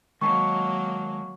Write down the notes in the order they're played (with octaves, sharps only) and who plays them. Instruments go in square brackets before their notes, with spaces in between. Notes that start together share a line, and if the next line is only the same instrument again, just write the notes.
[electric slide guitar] D#3 G#3 A5 [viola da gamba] F#3 A#3 [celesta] C#6